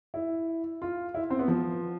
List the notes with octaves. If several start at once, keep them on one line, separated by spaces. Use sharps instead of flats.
E4
F4
E4
C4
B3
F3